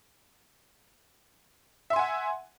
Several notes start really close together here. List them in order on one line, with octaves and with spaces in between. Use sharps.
E5 C6 G#5 F#5